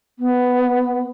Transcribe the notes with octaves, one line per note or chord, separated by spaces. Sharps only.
B3